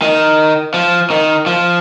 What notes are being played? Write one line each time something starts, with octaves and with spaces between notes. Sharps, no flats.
D#3
F3
D#3
F3